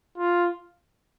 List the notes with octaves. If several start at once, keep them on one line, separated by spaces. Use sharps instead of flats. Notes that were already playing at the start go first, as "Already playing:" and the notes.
F4